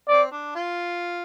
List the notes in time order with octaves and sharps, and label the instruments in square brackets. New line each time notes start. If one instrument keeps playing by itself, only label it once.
[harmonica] C4 [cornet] D5
[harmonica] D4
F4